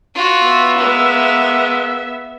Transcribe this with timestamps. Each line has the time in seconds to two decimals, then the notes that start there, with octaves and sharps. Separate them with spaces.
0.15 F4 F#4
0.44 B3 E5
0.78 G#3 A#3